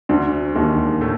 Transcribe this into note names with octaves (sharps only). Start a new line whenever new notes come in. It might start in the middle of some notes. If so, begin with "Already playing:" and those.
D2 D3
D#2 D#3
A2 A3